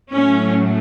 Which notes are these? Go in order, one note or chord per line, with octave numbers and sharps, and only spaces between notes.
A2 F#3 A3 C#4